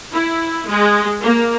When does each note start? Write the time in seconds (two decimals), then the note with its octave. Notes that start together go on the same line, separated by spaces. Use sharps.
0.12 E4
0.68 G#3
1.21 A#3